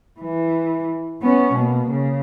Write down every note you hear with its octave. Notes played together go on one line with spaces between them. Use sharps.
E3
B3 C#4
B2 A#3
C#3